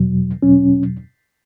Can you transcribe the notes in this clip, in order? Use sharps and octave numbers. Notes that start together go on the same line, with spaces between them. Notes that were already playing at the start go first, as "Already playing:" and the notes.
Already playing: E2 B2 F#3
E2 B2 F#3 C#4